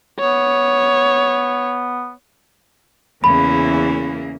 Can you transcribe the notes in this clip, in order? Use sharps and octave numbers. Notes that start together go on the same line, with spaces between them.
B3 C#5
E2 C#3 E3 A#3 E4 B5